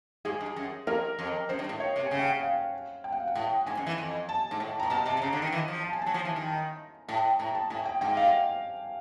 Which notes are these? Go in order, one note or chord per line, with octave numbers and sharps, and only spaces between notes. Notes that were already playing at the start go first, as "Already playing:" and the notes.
G#2 G#4
G2
F#2
F2 A#4
F2
F#2 C5
G2
A2
C#5
C3
C#3 G#5
G5
F#5
F5
G5
F#5
F5
F#5
A2
G#2 G#5
F#2
E3
F2
A5
G#2
A2
A#2 A#5
B2 A5
C3 A5
C3
C#3 A#5
D3
D#3
E3
F3
A5
G#5
F#3 A5
F3
E3
D#3
A#5
A2 A5
A2 A#5
A5
A2 G#5
G5
G#2 G5
F5